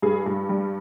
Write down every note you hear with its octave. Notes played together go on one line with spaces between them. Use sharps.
G2 G#4
G2
G3